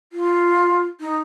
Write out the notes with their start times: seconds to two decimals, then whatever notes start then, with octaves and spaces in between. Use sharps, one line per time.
0.13 F4
1.01 D#4